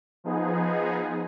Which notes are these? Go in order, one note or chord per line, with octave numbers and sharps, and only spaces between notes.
F3 B3 D#4 G#4